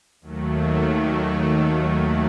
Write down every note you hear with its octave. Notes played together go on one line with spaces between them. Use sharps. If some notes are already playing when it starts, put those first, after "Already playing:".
D#2 D#3 F#3 A3